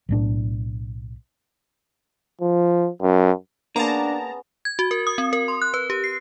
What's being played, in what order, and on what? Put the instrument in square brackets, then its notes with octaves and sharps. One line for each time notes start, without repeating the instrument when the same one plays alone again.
[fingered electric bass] B1 A2 D4
[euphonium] F3
F#2
[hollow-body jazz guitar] A#3 [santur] B3 C#4 G#4 [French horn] D4 [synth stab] A5 A#5
[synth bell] G#6
F#4
A#4
D#6
C4
A#4
C6
F#6
B4
G4
C7